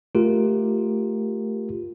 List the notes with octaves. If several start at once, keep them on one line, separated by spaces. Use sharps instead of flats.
A3 F4 G4 A#4